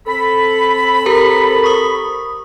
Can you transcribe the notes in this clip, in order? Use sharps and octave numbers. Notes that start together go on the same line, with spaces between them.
C4 A4 B5
G4 A#4 A#5
C#6 D#6